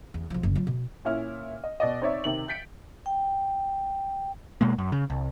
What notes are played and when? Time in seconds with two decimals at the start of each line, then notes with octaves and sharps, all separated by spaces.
0.14 E2
0.30 B1 F3
0.43 F#1 D2
0.55 F#3 F4
0.67 B2
1.05 A#2 C#4 E4 F6
1.64 D#5
1.80 B2 D5 D#5
2.02 C4 D#4 C#5 D5 E5
2.24 C3 D#3 F#7
2.48 G6 A6 B6 C#7 D7
3.06 G5
4.61 B2 G#3 A#3
4.78 F#2
4.92 C#3
5.10 C2